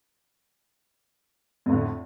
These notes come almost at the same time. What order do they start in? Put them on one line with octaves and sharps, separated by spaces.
F2 A2 D3